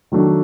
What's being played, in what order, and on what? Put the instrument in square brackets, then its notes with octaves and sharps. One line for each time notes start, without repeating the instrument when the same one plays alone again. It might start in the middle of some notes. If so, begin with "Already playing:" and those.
[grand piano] D#3 F#3 A3 D4 F#4